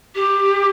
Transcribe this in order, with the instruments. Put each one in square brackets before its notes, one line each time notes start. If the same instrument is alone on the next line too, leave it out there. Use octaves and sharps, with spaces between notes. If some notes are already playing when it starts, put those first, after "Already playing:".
[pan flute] G4